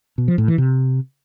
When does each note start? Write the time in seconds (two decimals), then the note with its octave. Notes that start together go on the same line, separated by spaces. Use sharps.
0.18 B2
0.28 F3
0.38 A2
0.48 E3
0.58 C3